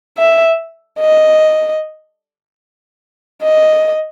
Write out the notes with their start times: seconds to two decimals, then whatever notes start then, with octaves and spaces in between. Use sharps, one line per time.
0.18 E5
1.00 D#5
3.43 D#5